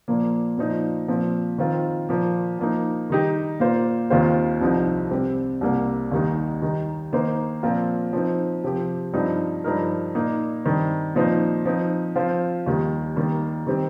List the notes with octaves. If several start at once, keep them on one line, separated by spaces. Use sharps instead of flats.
A#2 F3 A#3
A#2 F3 D#4
A#2 F3 C4
D#3 C4 F4
A#2 F3 A#3
F3 A#3 D#4
D#3 G3 D#4 G4
A#2 A#3 F4 C5
D#2 D#3 C4 F4 C5
C2 C3 F3 D#4
C3 G3 C4 G4
C2 C3 G3 A#3
D#2 D#3 G3 D#4
D#3 G3 D#4
D#3 A#3 D#4 C5
A#2 F3 C4 F4 A#4
F3 C4 D#4
C3 F3 C4 G4
G2 F3 C4 D#4
G2 F3 D#4 A#4
A#2 A#3 D#4
G2 D#3 C4
A#2 F3 C4 D#4 C5
F3 C4 D#4
F3 C4 F4 C5
D#2 D#3 G3
D#3 G3 A#3
D#3 G3 C4 G4